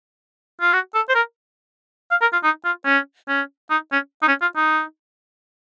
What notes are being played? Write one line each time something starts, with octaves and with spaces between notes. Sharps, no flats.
F4
F#4
A4
C5
A#4
F5
A#4
F4
D#4
F4
C#4
C#4
D#4
C#4
D#4
C#4
F4
D#4